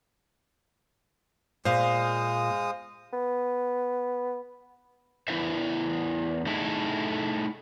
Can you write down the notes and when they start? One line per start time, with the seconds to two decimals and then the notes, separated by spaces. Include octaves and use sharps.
1.65 A#2 G#3 C5 F5 D#6
3.13 B3
5.28 E2 G#3 E4 B4 C5 E5
6.46 A3 D#4 E4 G#4 A4